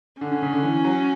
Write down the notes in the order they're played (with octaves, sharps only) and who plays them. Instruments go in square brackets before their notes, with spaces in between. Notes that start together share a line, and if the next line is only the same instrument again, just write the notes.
[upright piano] D3 [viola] C#4
[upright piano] D3
C#3
D3
E3
F#3